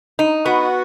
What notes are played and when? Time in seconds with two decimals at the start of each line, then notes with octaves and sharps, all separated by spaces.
0.19 D#4
0.46 B3 F#4